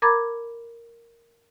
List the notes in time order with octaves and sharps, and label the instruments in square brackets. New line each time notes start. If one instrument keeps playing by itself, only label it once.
[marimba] A#4 A#5 B5 D6 G#6 A6